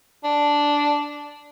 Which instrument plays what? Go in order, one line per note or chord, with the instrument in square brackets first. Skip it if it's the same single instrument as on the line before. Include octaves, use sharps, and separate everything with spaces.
[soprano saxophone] D4